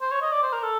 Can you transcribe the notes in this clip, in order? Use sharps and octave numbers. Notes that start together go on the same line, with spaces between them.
C5
C#5
D#5
D5
C5
A#4
A4